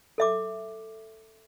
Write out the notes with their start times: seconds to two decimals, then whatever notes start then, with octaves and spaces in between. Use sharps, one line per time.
0.18 A4 E5 D6